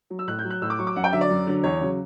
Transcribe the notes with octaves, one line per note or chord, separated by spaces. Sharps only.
F#3
E6
A2 F#6
G6
F#3
F#6
A2 E6
D6
F#3 C#6
D6
F#2 F#5
G5
D3 F#3 E5
D5
F#2
D3 F#3
E2 C#5
C#3 F#3